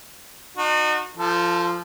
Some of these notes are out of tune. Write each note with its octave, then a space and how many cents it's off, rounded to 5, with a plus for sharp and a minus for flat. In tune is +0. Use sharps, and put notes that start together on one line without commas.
D#4 -40 F#4 -30
F3 -10 A4 +20